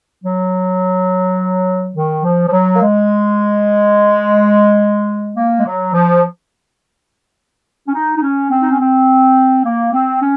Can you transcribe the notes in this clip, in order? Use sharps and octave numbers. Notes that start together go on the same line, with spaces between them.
F#3
D#3
F3
F3
F#3
A#3
G#3
A#3
G#3
F#3
F3
C#4
D#4
D#4
C#4
C4
D#4
C#4
C4
A#3
C4
C#4